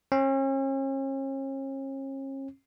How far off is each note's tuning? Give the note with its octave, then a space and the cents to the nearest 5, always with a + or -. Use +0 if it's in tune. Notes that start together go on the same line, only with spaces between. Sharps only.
C#4 -40